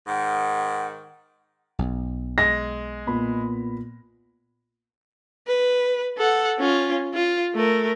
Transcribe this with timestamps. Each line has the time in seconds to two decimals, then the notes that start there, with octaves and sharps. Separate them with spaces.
0.07 G#2 D#3 F#5
1.79 B1
2.38 G#3 A#6
3.07 A#2 B3 B5
5.47 B4
6.18 A4 F#5
6.59 C#4 F4
7.14 F4
7.55 A3 A#4